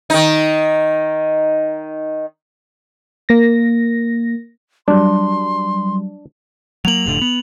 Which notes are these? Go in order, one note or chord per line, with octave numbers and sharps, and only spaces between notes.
D#3 D#4
A#3 A#6
F#3 G3 D4 C6
F#3 A#3 F7 F#7
F1 A2 D3
B3